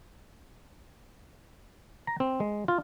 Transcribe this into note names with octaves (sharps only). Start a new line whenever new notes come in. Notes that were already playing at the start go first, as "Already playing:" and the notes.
A#5
C4
G#3
F4